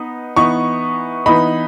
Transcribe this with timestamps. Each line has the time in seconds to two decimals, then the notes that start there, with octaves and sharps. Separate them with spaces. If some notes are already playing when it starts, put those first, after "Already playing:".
Already playing: B3 D#4
0.36 E3 B3 D#4 C#6
1.26 E3 B3 D#4 B5